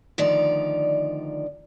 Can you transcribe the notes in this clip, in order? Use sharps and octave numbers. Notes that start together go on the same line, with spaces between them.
D2 D#3 F3 D#4 D5